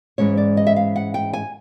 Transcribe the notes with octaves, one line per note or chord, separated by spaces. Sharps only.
G#2 E3 G#3 C#4 C#5
D5
D#5
E5
F5
F#5
G5
G#5